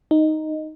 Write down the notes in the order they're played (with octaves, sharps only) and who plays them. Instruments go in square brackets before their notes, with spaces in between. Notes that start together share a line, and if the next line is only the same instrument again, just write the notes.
[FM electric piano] D#4